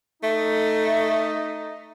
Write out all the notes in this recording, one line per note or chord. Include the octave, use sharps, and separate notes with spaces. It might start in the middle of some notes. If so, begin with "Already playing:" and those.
A3 D#4